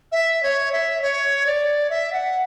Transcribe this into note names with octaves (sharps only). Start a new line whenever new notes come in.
E5
C#5
E5
C#5
D5
E5
F#5